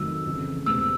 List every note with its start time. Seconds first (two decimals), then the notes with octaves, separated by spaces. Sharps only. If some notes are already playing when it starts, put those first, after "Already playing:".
Already playing: F2 C3 D#3 F#3 A3 E6
0.25 F2 C#3 E3
0.66 E1 E2 C3 E6